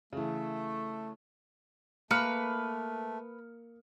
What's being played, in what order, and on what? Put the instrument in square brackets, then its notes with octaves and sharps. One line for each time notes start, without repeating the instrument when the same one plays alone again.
[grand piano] C#3 E3 [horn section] A3
[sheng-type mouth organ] A3 [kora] A#3 [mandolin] B4 [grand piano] F6 C#7